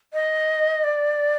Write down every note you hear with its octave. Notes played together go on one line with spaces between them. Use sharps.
D#5
D5